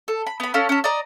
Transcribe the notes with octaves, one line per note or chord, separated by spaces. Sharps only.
A4
B5
B3 B5
C#4 A4 F5
C#4 A4
D5 D#5 A#5